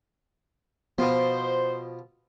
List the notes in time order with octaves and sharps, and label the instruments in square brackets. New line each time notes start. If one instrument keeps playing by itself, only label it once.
[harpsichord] B2 F3 [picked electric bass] B3 [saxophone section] C5